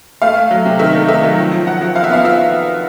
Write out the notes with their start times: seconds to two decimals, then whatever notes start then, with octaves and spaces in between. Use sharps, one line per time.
0.22 A3 F5
0.36 A3
0.51 F#3
0.65 C3
0.79 D#3 E5
0.94 A3
1.08 D#3 E5
1.23 F#3
1.37 F3
1.52 F3
1.66 F3 F#5
1.81 F3
1.95 F3 F5
2.04 E5
2.10 B3 F5
2.24 F3 E5